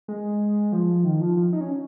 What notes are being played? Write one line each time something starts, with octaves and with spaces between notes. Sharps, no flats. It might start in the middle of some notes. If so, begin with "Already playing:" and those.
G#3
F3
D#3
F3
F3
D#4
C#4